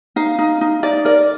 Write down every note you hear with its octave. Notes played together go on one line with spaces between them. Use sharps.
D#4 F5
D#4
D#4
D#4 D5
A#4 D5